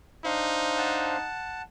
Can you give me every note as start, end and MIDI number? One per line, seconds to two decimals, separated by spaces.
0.25 1.17 62
0.25 1.30 63
0.25 1.17 72
0.25 1.17 77
0.78 1.62 78
0.78 1.62 81